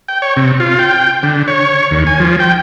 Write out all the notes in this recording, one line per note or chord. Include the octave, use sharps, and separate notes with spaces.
G5
C#5
C3
F4
G5
D3
C#5
D#2
G#5
F3
G5